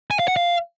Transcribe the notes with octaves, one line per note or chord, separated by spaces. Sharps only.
G#5
F5
F#5
F5